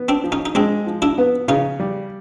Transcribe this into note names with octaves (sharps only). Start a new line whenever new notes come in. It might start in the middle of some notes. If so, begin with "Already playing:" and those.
Already playing: B3
C4 D4
F3
C#4 D#4
D#4
G#3 C4 D4
F3
D4 E4
B3
C#3 C#4 D#4
G3